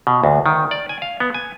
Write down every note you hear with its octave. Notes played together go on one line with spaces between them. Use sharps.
B2
D2
D#3
D5
G#5
F5
B3
G#5